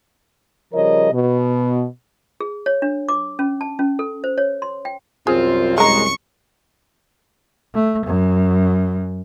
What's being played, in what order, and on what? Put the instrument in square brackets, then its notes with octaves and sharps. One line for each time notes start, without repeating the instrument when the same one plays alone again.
[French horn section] C#3 F3 G3 A#4 C#5 D#5
B2
[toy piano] G#4
C#5
D4
D6
C#4
A5
C#4
A4
C5
C#5
C6
G5
[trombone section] C2 F#2 [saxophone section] C4 F4 [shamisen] G#4
[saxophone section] G#3 [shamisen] C#4 A#5 [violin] C#6 C#7
[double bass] A3
F#2